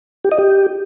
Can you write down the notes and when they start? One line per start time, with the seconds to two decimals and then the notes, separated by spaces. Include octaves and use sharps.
0.24 G4
0.31 D#5
0.38 G4